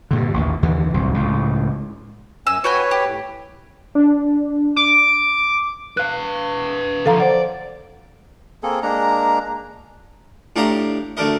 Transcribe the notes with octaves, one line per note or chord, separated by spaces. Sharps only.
G2 A#2 D3
A1 D#2
D#2 D3 E3
D1 C2 F#2
C#2 A2
F#2 G#5 E6
F#4 B4 C#5 G5 G#5
G4
A2
D4
D6
B4 F5 F#6
D3 F3 A4 F5 A#5
C5 D5 F#5
A#3 C4 G#4 A4
G#3 A#3 D4 A#5
A2 D4 G4 F5 A#5 D#6
D2 A3 D4 A#4 D#5